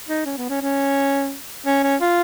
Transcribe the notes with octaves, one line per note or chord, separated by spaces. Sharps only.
D#4
C#4
B3
C#4
C#4
C#4
C#4
F4